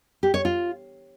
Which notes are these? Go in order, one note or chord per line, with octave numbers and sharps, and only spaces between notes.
G4
C#5
F4